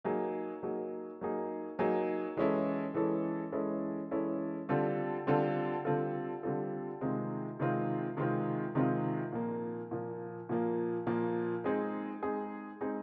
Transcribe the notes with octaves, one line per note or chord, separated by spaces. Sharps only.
F#3 A#3 D#4 G#4
F#3 A#3 D#4 G#4
F#3 A#3 D#4 G#4
F#3 A#3 D#4 G#4
E3 G#3 C#4 E4 A4
E3 G#3 C#4 E4 A4
E3 G#3 C#4 E4 A4
E3 G#3 C#4 E4 A4
D3 G3 C4 F4 A4
D3 G3 C4 F4 A4
D3 G3 C4 F4 A4
D3 G3 C4 F4 A4
C3 D#3 G#3 C4 F4
C3 D#3 G#3 C4 F4
C3 D#3 G#3 C4 F4
C3 D#3 G#3 C4 F4
A#2 F3 A#3
A#2 F3 A#3
A#2 F3 A#3
A#2 F3 A#3
G#3 C4 D#4 G#4
G#3 C4 D#4 G#4
G#3 C4 D#4 G#4